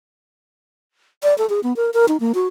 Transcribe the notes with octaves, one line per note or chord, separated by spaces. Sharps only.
D5
A4
G#4
B3
A#4
A#4
D#4
A#3
F#4